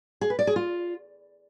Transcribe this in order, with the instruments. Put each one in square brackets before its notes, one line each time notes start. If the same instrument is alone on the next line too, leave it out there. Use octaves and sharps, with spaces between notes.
[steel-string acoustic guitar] G#4
B4
D5
G#4
F4